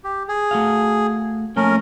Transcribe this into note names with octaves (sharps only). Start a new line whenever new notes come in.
G4
G#4
A3 F#4 F5
F3 A3 A#3 C#4 A#4